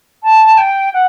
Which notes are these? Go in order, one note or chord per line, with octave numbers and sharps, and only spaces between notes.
A5
G5
F#5